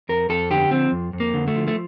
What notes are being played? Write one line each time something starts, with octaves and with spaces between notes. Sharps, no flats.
F2 A#4
F2 A4
D3 G4
F3 C4
F2
F2
A#3
D3
A3
F3
A3